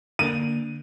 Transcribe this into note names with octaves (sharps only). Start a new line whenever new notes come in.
D3 A#3 D4 D#7